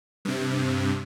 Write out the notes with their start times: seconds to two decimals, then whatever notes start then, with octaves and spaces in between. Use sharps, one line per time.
0.25 G2 C3